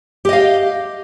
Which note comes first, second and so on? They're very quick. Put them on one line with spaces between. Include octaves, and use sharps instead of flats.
G4 D#5 F5